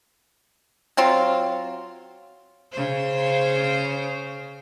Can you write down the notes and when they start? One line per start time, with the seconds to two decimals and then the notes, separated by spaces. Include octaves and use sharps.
0.97 F#3 C4 F4
2.72 C#3 C5